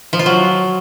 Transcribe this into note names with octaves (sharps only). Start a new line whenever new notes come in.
F3
F4
F#3